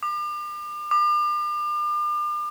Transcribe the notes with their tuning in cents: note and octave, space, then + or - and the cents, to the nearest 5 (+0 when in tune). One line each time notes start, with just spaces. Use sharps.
D6 +40
D6 +40